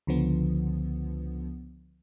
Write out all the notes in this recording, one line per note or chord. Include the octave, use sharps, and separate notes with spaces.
C#2 D3 F3 B3